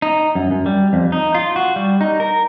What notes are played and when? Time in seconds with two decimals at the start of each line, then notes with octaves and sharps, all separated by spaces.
0.02 D#4
0.35 F#2
0.51 F#2
0.66 G3
0.93 F2
1.12 D#4
1.35 F4
1.56 F#4
1.76 G3
2.01 D#4
2.20 A#4